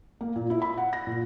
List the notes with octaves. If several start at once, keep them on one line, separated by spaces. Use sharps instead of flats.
A#3
A#2
E4
B5
F#5
A#6
A#2